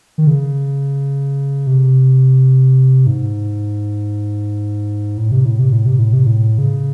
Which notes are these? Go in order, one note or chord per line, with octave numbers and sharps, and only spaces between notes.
D#3
C#3
C3
G#2
A2
C3
A2
C3
A2
C3
A2
C3
A2
C#3